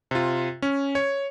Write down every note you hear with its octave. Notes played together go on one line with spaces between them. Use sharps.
C3 F4
C#4
C#5